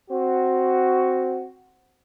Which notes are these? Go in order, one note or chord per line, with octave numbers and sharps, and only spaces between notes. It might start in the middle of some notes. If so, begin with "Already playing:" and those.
C4 F#4